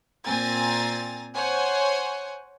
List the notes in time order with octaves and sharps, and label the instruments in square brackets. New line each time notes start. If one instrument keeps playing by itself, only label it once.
[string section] A#2 C4 G#5 A#5 A6
C5 C#5 F#5 G#5